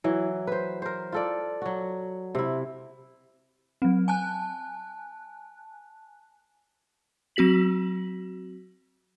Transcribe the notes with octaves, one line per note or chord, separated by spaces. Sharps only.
E3 F#3
B4 C5
A#4 C5
F4 A4 D5
F#3 F#4
C3 E4
F#3 C4
G#5 A5 F#6
F#3 C4 F#4 B6 F#7